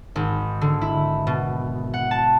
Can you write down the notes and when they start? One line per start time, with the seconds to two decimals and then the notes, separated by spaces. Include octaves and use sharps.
0.16 G#1
0.61 D3
0.81 E4
1.27 B2
1.94 F#5
2.11 A5